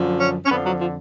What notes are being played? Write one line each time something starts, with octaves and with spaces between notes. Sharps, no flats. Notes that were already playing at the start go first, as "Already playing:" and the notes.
Already playing: F#2 D3 F3
C#4
C#4
F2 D3 F3 B3
F#3
F3